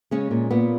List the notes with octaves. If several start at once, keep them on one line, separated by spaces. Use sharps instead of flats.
C#3 G#3 C#4
A#2
A#2 B3